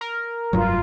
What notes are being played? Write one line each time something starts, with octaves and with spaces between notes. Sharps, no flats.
A#4
F1 G2 F#3 F4 A#5